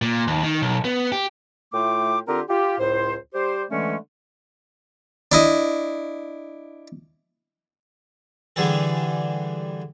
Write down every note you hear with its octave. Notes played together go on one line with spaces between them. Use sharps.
A#2
D#2
D#3
B1
B3
G4
A2 A3 F4 G5 D6
D3 C4 F4 G4 A#4
F4 G4
C#2 A2 C5
G3 G4 C5
D3 E3 G#3 A3 C#4
D4 E4 D#5
D3 E3 G3 G#4 A4